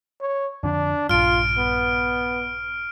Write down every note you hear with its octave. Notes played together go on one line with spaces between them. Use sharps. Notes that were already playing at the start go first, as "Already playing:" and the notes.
C#5
F2 D3 D4
A#1 G2 F4 F6 D7
B3